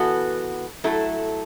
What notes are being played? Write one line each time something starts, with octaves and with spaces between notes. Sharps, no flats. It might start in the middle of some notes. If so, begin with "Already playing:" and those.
Already playing: E3 B3 F#4 A4
F#3 A3 E4 A4